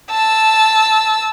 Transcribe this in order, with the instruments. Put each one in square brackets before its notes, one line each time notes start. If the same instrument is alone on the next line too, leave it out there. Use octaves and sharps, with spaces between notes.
[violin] A5 E6